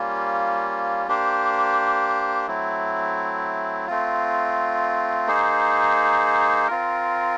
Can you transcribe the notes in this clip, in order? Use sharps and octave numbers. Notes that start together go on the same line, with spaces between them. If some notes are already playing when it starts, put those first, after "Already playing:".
Already playing: G3 A#3 C#4 F4
A#3 D4 G4 C5
F#3 A3 C4 E4
A3 C4 F4
A#3 D#4 G#4 C5
C4 F4 A#4